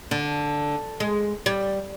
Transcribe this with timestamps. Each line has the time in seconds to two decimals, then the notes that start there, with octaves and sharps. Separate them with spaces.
0.11 D3
1.00 G#3
1.46 G3